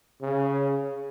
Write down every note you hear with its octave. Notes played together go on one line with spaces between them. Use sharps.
C#3